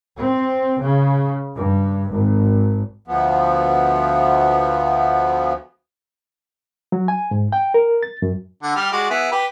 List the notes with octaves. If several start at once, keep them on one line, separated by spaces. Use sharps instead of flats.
C4
C#3
G2
G#1
D2 F3 B3
F#3
G#5
G#2
G5
A#4
A6
F#2
D3 F#5
G3 G4 F6
G#3 F#4 D5
B3 E4 G#4
G4 B4